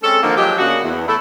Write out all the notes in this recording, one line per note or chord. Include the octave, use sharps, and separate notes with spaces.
G#3 C4 C#4 A4
D3 D#3 F3 A#3
F3 F#3 G#3 G4
C#3 A#3 B3 D4 F#4 F#5
E2
A3 E4 A4